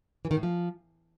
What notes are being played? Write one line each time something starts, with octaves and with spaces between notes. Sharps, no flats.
E3
D#3
A2
F3